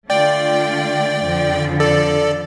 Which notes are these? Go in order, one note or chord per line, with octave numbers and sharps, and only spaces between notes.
D3 A3 D4 F4 D5 G5
F2 D3 F3
A4 D5